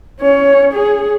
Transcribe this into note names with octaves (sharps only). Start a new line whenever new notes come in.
C#4 C#5
G#4